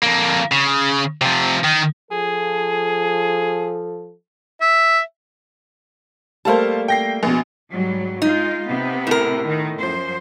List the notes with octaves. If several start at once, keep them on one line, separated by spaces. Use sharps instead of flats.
F2 A#3
C#3
C3 F3
D#3
F3 G#4 A4
E5
G3 A3 A#3 C5 F5 A5
G5 A#6 C7
A#1 B2
G#2 F#3 G3
G#3 D#4 F4
C3 B3
A2 A#4
D#3
F#2 F3 C5